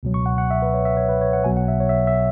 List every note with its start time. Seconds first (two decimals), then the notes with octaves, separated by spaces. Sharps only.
0.03 C#2 B2 F#3
0.14 C#6
0.26 F#5
0.38 F#5
0.51 E5
0.62 B4
0.74 C#5
0.85 E5
0.97 C#5
1.09 B4
1.21 C#5
1.33 F#5
1.44 B1 B2 F#3 G#5
1.57 F#5
1.68 E5
1.80 C#5
1.89 E5
2.07 E5